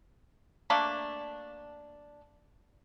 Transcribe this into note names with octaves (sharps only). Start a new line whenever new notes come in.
A3 A#3 D4